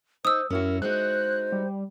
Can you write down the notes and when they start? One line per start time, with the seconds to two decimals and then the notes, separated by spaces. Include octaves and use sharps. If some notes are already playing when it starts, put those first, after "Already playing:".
0.25 D#4 C5 D#6 E6
0.50 F#2 C#4 E4 F#4 A#4
0.82 G#3 D#4 F#4 C5 F#6
1.52 G3